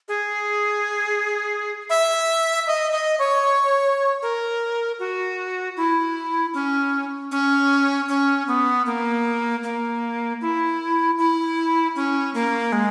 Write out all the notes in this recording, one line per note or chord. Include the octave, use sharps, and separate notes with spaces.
G#4
E5
D#5
D#5
C#5
A#4
F#4
E4
C#4
C#4
C#4
B3
A#3
A#3
E4
E4
C#4
A#3
G#3